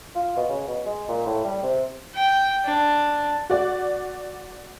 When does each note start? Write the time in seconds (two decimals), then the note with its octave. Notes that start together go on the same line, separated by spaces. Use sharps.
0.16 F4
0.37 B2
0.49 C#3
0.68 B2
0.86 G#3
1.09 A#2
1.26 A2
1.44 G3
1.63 C3
2.15 G5
2.65 D4
3.50 F#4 D5